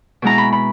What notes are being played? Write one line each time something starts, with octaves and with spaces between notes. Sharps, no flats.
B2 G#3 B3 E4 A#5
B5
B5